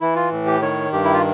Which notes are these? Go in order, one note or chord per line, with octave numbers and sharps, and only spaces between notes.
E3 E4
F4
A2
G4
D#3 C#5
G2 G4
E4
F4